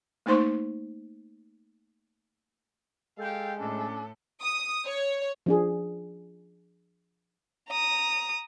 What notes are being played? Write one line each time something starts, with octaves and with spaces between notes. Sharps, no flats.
A3 A#3 D#4 C5 C6 C#6
G#3 G4 A4 F5 G5
A2 C#4 D4 A4
D#6
C#5
F3 D4 G#4
A#5 D#6